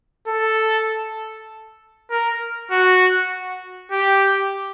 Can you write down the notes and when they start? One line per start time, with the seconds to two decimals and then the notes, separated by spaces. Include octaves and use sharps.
0.27 A4
2.11 A#4
2.71 F#4
3.92 G4